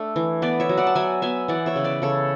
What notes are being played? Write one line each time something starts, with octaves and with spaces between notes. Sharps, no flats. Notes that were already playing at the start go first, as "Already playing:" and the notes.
Already playing: A3 D4
E3
B3 B4 D5
C#5 E5
F#3
D5 F#5
A5
F#3 E5 G#5
B3 E5 G#5
E3 D5 F#5
C#5 E5
C#3
B4 D5
C#3 A4 C#5